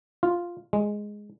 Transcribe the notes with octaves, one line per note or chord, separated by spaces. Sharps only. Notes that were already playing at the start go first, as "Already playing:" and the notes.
F4
G#3